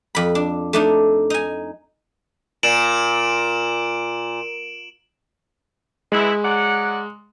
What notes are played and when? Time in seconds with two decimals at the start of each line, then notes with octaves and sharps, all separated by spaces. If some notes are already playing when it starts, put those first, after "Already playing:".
0.15 F2 B5
0.35 D4
0.73 A3 D4 D#4
1.30 D#4 G#5
2.63 A#2 D7 E7 F#7
6.12 E3 G#3 B3 E4
6.43 F#3 D5 F#5